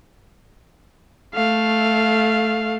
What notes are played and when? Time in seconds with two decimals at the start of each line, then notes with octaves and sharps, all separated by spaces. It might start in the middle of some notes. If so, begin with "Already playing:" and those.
1.35 A3 F5